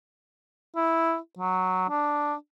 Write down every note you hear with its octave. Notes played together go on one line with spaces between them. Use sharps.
E4
F#3
D4